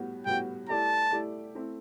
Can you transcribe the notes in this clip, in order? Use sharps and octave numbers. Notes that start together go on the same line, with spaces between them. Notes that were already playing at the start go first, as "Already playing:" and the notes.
Already playing: A2 G3 B3 F#4
A2 G3 B3 F#4 G5
A3 E4 G4 D5 A5
A3 E4 G4 D5
A3 C4 E4 A4